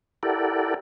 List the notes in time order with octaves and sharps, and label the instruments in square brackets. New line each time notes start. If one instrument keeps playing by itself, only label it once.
[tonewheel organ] E4 G4 A4 A#4 D5 F#5